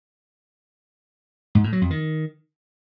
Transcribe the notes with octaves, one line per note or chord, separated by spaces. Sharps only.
G#2
A2
F#3
F2
D#3